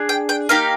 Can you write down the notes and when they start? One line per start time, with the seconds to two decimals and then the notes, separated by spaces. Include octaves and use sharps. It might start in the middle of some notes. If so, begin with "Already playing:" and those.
Already playing: D4 G#4
0.09 G5
0.29 G5
0.49 A#3 D#4 G4 F5